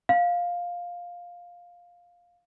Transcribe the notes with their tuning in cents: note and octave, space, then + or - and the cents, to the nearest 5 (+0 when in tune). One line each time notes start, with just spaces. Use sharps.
F5 +10